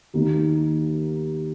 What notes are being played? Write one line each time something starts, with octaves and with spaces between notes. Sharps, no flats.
D#2 D#3 A#3